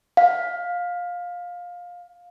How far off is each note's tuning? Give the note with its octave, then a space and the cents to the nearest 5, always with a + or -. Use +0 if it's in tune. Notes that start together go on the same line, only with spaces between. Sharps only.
F5 +20